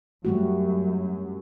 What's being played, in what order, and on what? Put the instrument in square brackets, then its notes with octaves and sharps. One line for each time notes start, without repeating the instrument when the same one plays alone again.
[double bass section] F#2 [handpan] G3 A3 F#4